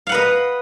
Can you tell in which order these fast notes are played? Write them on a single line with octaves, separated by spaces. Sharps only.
F5 F#5 B4 D#5